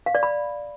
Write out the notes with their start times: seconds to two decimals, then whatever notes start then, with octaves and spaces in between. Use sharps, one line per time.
0.06 F5
0.15 D5
0.23 B5